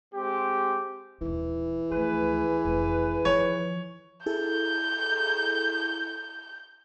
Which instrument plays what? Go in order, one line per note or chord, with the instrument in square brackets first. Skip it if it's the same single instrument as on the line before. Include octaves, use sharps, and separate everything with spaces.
[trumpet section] G#3 C4 G4
[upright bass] D#1 D#4 [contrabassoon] E3
[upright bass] D2 F3 [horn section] G#4 B4
[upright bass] F1
[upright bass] D#3 F3 [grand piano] C#5
[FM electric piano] E4 G#4 A4 [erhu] G6